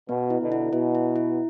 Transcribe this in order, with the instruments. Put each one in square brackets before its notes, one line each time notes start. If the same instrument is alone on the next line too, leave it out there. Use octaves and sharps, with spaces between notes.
[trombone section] B2 [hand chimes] B3
[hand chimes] E4
[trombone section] B2 D3
[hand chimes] E4
[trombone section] B2 [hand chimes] E4
[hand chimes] E4
E4